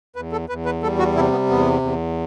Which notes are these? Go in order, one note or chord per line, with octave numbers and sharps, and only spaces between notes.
E2 B4
A4
E2 B4
B4
G3 A4
F#4
C3 E4
B3
E2 B3
E2